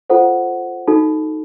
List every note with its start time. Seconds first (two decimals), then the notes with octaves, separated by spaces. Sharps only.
0.10 F4 A4 C5 F#5
0.87 D#4 F#4 A4